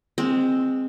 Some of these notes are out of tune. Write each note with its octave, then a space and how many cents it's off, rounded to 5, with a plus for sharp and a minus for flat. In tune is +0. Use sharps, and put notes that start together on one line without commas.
G#3 -15 C4 +0